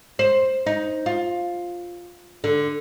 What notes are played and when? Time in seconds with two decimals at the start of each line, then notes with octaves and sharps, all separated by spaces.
0.19 C5
0.66 D#4
1.06 F4
2.44 D3